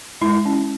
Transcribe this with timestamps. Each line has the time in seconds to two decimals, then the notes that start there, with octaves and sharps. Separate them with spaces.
0.21 G#3 E4
0.45 C#4